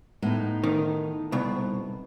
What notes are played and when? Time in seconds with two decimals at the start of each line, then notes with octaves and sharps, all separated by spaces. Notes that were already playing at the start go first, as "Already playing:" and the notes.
0.22 A2 B3 D#4
0.64 D#3
1.32 C2 B2